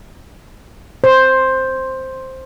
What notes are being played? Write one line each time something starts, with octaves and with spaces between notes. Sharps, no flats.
C5